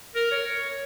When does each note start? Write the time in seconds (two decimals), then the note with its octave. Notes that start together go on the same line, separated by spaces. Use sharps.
0.15 A#4
0.31 C#5